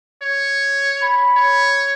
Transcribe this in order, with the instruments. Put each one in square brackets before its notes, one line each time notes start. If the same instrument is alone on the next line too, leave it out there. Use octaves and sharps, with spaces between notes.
[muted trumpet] C#5
[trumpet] B5
[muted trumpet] C#5